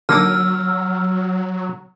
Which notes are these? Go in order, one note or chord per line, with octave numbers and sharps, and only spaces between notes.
D3 F#3 A#3 D#4 E6 F6